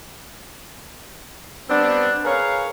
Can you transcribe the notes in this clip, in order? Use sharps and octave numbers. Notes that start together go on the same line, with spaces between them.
G3 B3 C4 D4
G#4 A#4 B4 C#5 F5